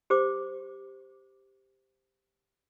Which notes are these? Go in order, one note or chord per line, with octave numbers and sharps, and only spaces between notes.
G4 C5 D6